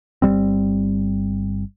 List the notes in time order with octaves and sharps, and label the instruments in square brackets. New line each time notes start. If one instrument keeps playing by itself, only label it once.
[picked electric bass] G1 G#2 G3 C4